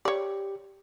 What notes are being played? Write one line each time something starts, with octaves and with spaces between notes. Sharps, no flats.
G4 C#5 D5